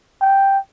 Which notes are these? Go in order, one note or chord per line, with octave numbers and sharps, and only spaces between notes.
G5